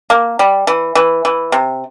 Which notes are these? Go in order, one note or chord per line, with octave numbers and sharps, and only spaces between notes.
A#3
G3
E3
E3
E3
C3